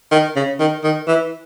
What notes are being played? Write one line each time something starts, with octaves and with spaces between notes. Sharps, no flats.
D#3
C#3
D#3
D#3
E3